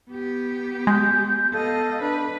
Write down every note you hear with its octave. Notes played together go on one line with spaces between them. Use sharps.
B3 G4
G#3 G6
B3 A4 D#5 F5
D4 B4